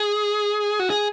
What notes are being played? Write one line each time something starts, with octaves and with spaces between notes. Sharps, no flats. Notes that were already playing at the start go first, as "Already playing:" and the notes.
Already playing: G#4
F#4
G#4